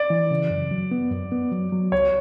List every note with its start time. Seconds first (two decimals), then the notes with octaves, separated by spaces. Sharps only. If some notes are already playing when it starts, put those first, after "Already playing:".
Already playing: D5
0.10 E3
0.31 C#3
0.50 F#2
0.71 F#3
0.91 B3
1.11 F#2
1.32 B3
1.52 F#3
1.72 F#3
1.92 C#2 C#5